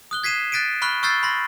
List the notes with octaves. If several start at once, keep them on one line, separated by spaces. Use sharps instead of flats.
D#6 F#6 G7
G#6 B6 C7 D#7 E7
F#6 A6 B6 D7 D#7
B5 C#6 F6 F#6 G7
C#6 E6 F6 G6 A6 C7
B5 C6 A#6